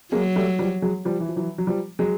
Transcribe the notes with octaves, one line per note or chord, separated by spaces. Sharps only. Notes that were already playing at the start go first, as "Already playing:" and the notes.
F#3 G#3 A#3
G3 A3
F3 G3
F#3 G#3
F3 G3
E3
F3
E3 F#3
F#3
F3 G3
F#3 G#3